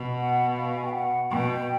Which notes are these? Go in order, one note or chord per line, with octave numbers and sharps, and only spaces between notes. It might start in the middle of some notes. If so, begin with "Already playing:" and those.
Already playing: B2
F#5
F5
G#5
G5
F#5
B2 G5